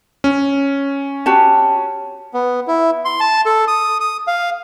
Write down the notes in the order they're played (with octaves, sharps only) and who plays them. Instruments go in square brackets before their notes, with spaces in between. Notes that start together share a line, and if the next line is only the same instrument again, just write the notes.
[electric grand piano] C#4
[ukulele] F#4 G4 A5
[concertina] B3
E4
C6
A5
A4
D#6
D#6
F5